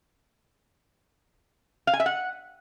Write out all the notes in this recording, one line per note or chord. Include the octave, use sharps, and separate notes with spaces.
F5
G#5
E5
F#5